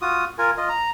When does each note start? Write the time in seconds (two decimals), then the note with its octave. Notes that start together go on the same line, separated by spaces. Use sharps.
0.02 F4 F#4 D#6
0.38 F4 A#4 G#5
0.57 F4 D#5
0.69 A#5